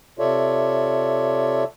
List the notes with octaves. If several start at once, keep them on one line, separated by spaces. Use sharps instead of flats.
C3 F4 A4 C#5 D5 E5